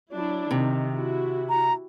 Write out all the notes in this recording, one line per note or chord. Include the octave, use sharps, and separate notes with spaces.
F#3 D4 E4
C3 D#3
E4 F#4
A#5